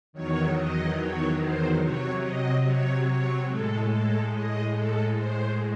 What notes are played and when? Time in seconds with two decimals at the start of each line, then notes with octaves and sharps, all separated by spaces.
0.13 E2 D#3 F#3 C#5
0.55 D#5
0.97 C#5
1.38 C5
1.80 C3 F#3 C#5
2.22 D#5
2.64 C#5
3.05 C#5
3.47 A2 G#3 A4
3.88 A4
4.31 D#5
4.72 A4
5.14 A2 G#3 C5